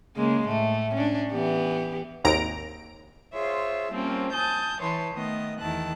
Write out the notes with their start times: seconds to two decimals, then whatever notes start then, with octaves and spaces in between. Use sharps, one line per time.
0.16 C#3 G#3 A#3
0.47 A2 A3
0.94 C#4 D4
1.31 E3 B3 G4
2.24 G#1 D#2 A#5 D7
3.33 F4 G#4 C5 C#5 E5
3.92 F3 G3 A#3 C4 C#4
4.33 G#5 A5 D#6 G6
4.80 E3 B4 C#5 A5 C6
5.14 D#3 A3 B3 D#5
5.59 E2 D#3 E4 A5 F#6